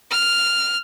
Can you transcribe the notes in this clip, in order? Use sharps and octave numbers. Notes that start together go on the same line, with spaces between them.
F6